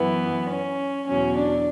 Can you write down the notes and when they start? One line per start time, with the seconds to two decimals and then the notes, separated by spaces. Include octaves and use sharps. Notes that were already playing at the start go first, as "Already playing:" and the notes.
Already playing: F#2 E3 B3
0.49 C#4
1.07 E2 B2 F#3 C#4
1.37 D4